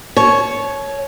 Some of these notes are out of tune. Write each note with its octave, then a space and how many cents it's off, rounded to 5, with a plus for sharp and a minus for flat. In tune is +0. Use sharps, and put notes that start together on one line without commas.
C#5 +0 A5 -45